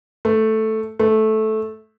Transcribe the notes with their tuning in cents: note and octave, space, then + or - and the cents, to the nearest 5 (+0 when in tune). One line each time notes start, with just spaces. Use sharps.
A3 +0
A3 -10